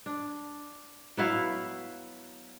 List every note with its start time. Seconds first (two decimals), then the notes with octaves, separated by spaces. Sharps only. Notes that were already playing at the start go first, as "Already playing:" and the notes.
0.06 D4
1.17 F#3 B3 E4 F5